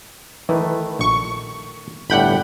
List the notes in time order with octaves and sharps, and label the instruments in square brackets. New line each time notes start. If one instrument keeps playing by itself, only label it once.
[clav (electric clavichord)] D#3 A3 B4 [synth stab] E3
[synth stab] A#1 C#6
[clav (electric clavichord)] G1 A2 G3 [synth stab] F#5 G5 B5